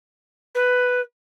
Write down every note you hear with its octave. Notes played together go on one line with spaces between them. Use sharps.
B4